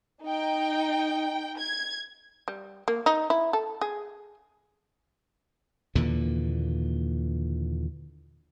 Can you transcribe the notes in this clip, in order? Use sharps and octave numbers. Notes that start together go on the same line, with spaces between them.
D#4 G5
G#6
G3
A#3
D#4
E4
A4
G#4
D#2 A#2 D3 E3